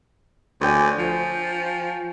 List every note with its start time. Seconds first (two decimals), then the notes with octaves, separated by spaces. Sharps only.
0.61 D2 C#5 G5 G#5
0.98 F3